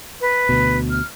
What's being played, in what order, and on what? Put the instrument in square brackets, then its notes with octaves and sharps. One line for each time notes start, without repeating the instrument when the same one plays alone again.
[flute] B4
[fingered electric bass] D2 B2
[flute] F6